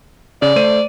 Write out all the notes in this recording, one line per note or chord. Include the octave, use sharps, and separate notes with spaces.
C#3 D5
A3 C5 D#7